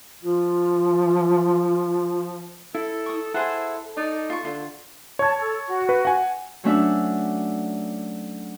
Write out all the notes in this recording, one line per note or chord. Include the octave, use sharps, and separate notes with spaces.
F3 F4
E4 A4
C#6 D#6
E4 G#4 A4 C5 F#5
D#4 D5
F4 C#6
D3 F4
C#5 A5 G#6
A4
F#4
B4
F#5 G#5
F#3 A3 C#4 D4 E5